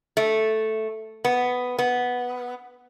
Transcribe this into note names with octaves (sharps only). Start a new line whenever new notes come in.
A3
B3
B3